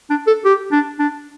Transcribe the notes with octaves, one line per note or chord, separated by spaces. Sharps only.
D4
A4
G4
D4
D4